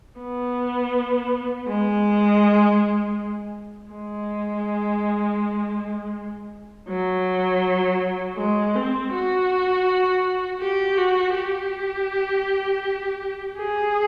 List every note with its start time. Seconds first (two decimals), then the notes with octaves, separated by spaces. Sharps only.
0.20 B3
1.68 G#3
3.91 G#3
6.89 F#3
8.37 G#3
8.75 C4
9.12 F#4
10.61 G4
10.98 F#4
11.35 G4
13.58 G#4